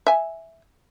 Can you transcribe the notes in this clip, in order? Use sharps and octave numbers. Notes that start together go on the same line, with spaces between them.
E5 G#5